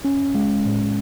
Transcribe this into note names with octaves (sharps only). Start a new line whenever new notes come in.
C#4
G#3
A2